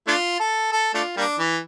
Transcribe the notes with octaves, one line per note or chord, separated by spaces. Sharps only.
A3 D4 F4
A4
A4
A3 D4 F4
G3 A#3 D4
E3